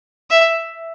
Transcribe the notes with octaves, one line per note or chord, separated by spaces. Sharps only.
E5